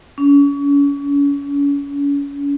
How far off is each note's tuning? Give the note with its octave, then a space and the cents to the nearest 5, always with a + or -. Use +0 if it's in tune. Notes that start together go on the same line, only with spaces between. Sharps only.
C#4 +35